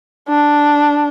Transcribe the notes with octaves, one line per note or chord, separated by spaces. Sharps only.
D4